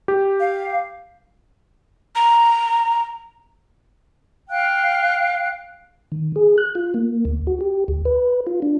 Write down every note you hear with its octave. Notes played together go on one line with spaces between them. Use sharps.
G4
F5
A#5
F5 G5 F#6
D#3
G#4
F#6
F4
A#3
D2
F#4
G4
D2
B4
F4
D4